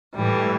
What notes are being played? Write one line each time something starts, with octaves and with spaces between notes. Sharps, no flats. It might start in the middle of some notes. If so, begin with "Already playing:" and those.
A2 E3 G3